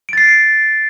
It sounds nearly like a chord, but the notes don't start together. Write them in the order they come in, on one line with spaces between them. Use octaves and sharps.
D7 A6 C7